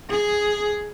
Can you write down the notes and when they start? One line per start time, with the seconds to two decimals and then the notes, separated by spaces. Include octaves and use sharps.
0.11 G#4